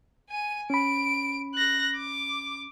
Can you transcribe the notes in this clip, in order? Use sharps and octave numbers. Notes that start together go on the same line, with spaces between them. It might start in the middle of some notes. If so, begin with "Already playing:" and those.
G#5 D#7
C#4 B5 D7
F#6 A#6
D6